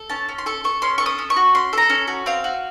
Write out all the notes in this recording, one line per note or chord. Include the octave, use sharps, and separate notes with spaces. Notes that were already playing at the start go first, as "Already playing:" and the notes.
Already playing: A4
C#4 A5
C#4
C6
A4 C#6
A4 C#6
C#4 C6
A4 C#6
D#6
C#4
C#6
F#4
C#4 C6
A4 A#5
C#4
F#4
C4 F5
F#4